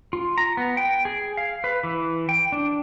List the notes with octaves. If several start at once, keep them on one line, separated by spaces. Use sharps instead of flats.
F4
A#5
B3
G5
G#4
F5
B4
E3
G5
D4